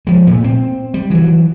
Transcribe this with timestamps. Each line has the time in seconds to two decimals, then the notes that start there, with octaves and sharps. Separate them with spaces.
0.07 F3 G#3
0.27 A#2 A3
0.44 C4
0.94 G3
1.10 E3 F#3